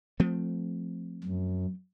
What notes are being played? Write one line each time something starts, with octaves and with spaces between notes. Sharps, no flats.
F3 A3 C4
F#2